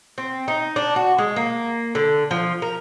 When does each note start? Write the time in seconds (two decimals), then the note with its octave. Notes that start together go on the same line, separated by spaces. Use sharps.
0.18 C4
0.48 D#4
0.76 D4
0.96 F#4
1.18 G#3
1.36 A#3
1.95 D3
2.31 F3
2.62 A#4